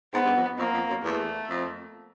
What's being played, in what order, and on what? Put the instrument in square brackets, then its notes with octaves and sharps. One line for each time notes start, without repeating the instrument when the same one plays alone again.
[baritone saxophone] G#2 [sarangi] B3
[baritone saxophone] G2
F2
[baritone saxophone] F2 [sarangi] A#3
[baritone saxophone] F2
F#2
[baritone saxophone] E2 [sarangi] A3
[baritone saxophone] F2